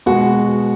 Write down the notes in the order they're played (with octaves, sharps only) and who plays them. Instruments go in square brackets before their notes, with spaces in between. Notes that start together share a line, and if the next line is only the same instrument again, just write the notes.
[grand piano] B2 G#3 B3 F#4